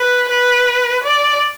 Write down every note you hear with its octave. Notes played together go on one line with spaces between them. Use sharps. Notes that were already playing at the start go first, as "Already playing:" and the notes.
Already playing: B4
B4
D5